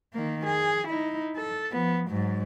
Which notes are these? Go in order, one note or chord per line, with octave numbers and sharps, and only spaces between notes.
D#3 A#3
G#4
D#4 E4
A4
F3 B3
G#2 F#3